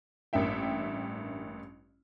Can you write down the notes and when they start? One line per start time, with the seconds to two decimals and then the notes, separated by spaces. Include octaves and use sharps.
0.33 A1 G2 A#3 E5 G5